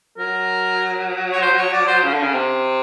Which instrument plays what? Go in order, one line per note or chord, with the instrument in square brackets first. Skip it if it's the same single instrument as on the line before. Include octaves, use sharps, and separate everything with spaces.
[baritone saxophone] F#3 [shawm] A#4
[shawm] C#5
C5
C#5
D5
C5
[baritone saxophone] C#3
D3
C#3
C3